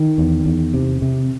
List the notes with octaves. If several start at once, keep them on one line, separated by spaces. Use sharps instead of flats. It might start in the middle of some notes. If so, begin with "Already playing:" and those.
Already playing: D#3
E2
E2
C3
C3